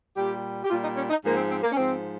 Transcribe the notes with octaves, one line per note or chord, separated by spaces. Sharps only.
A#2 G3 G4
G4
A#2 G3 F4
D#4
C#4
D#4
G#2 F3 A#3
C4
C4
A#3
C#4
G#2 F3 C4